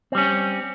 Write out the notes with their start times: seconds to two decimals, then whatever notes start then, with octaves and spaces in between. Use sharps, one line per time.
0.12 C4
0.15 G3
0.18 C#4